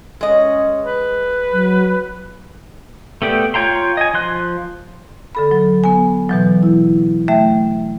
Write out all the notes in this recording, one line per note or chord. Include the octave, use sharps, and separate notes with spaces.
G#3 C#4 D#5
B4
F#3
A3 B3 G4 D5
F4 C#5 G5 A#5 C6
D#5 G#5
F3 C6 F#6
D3 A4 B5
F#3
B3 G#5
B2 E3 F#3
E4
A3 E5 G5